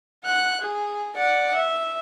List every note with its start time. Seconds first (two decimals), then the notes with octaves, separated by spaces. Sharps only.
0.24 F#5 F#6
0.61 G#4
1.16 D5 F#5
1.55 E5